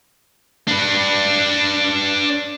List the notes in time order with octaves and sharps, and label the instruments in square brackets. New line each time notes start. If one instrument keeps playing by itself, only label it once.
[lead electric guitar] D4 B4